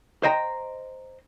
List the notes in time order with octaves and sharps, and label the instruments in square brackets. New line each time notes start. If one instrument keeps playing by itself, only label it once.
[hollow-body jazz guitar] C5 D#5 G5 A#5